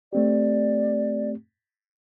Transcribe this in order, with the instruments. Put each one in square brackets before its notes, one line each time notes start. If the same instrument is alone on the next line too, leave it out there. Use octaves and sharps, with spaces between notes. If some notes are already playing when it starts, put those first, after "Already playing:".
[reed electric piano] A3 C4 G4 [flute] D5